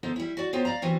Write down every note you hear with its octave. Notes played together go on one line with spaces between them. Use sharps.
D3 B3 D#4 A4 C5
G3 E4
F#4 D5
B3 D#4 F4 G4 C5 C#5
D5 F5 A#5
E3 G3 B3 C4 F#4